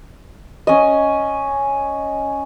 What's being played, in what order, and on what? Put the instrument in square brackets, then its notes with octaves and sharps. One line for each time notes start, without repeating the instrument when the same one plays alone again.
[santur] C#4 D#5